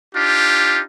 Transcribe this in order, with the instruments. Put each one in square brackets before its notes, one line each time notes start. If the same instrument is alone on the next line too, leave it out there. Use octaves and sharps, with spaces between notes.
[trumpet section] D4 D#4 F4 G4